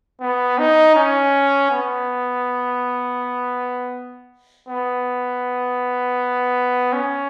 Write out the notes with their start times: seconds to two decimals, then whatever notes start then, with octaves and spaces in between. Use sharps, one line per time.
0.21 B3
0.59 D#4
0.96 C#4
1.71 B3
4.69 B3
6.93 C#4